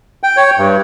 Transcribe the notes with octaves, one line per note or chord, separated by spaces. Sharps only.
G5
C#5
G2